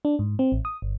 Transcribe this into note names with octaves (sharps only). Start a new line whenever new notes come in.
D4
G#2
C4
A1
D#6
G1